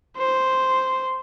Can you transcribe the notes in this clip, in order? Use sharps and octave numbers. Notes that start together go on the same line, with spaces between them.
C5